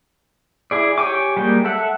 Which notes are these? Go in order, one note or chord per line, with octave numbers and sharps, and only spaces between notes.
E4 G#4 D5
G4 C#5 G5 G#5 D6
G3 G#3 A#3 G5
A4 E5 F#5